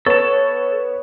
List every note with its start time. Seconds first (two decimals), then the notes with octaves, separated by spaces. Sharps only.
0.06 B3 A4 C#5 A5